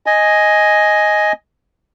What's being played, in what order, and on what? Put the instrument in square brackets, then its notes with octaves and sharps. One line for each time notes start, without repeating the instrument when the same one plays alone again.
[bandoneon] D#5 G#5